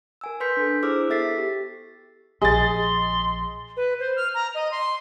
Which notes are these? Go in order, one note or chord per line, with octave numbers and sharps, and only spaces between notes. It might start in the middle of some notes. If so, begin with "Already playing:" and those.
A#4 G#5 E6
B4 G#5 C6 G6 B6 C#7
D4 A4
E4 G#4 C5 D6 E6 F6
B3 A4 E5 A6 B6 C7
G4
A#1 G#4 D#5 C6 A6
B4
C5
F6
A#5
D#5
C6